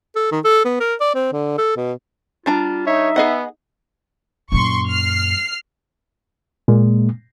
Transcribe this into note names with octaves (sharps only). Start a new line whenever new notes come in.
A4
D#3
A4
B3
A#4
D5
C4
D3
A4
B2
G3 D4 F4 A#5
D#4 C#5 E5
B3 G#4 D#5 F#5
F#2 A#2 C6 C#6
F6 C7
A#2 G#3 A#3